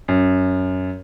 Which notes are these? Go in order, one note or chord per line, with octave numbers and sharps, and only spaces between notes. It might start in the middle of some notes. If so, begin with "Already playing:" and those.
F#2